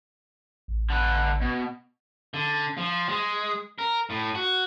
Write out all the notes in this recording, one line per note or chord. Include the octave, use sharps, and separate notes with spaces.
A1
D3 B4
B2
D3
F3
G#3
A#4
A2
F#4